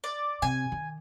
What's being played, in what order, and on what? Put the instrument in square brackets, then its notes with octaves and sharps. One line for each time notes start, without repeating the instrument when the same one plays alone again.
[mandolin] D5
[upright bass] C3 [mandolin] G#5
[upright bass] D#3